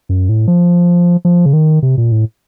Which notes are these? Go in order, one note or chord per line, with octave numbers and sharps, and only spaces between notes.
F#2
A2
F3
F3
C#3
D#3
C3
A#2
A2